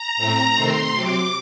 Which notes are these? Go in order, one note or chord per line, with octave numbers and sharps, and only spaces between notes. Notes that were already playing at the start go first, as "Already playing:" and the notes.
Already playing: A#5
A2 A3 C4
C3 D#3 A3 C4 C6
C3 F#3 C4 D6